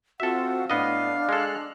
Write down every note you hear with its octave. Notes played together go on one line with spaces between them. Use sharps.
C4 F4 F#4 A4 E5 F#5
A2 B3 D4 D#5 F5
G#3 A4 F6 F#6